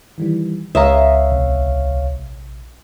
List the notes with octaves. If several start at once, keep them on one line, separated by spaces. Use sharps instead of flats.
D#3 E3 G3
C#2 C#5 E5 F5 A#5 D#6
A#1 C3